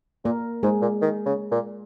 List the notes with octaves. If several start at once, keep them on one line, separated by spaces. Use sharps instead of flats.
A#2 A#3 A#4
G#2 G#3 G#4
A#2
D#3
C#3
A#2